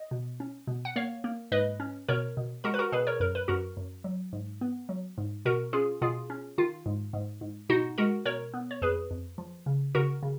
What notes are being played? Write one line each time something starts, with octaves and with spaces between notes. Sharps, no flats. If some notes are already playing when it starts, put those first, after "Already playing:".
Already playing: D#5
B2
C#4
B2
F#5
A#3 C#5 F5
A#3
G#2 B4 D#5
C#4
B2 A#4 C#5
B2
G#3 F#4 A#4
B4
F#4 A#4
B2 G#4 B4
A#4 C#5
F#2 A#4
B4
F#2 F#4 A#4
F#2
F#3
G#2
B3
F#3
G#2
B2 F#4 A#4
C#4 F4 G#4
B2 F4 G#4
C#4
D#3 F4
G#2
G#2
G#2
B2 D#4 F#4
G#3 F#4 A#4
B2 A#4 C#5
B3
C#5
F2 G#4 B4
F2
F3
C#3
C#3 F#4 A#4
C#3